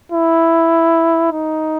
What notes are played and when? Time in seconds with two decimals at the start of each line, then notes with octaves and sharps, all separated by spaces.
0.12 E4
1.32 D#4